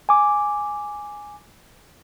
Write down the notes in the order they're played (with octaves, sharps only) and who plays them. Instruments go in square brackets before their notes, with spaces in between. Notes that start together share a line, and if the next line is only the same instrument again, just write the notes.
[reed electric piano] G#5 D6